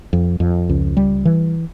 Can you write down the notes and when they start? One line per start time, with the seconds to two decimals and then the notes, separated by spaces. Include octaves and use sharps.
0.13 F2
0.40 F2
0.69 C#2
0.97 G3
1.25 E3